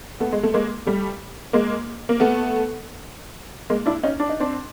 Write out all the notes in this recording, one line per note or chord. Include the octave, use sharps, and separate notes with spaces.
A3 B3
G#3
A3
G#3 A#3
G3 A3
G#3 A#3
A#3
A3 B3
G#3 A#3
D4 E4
C#4 D#4
D4
D#4
C4 D4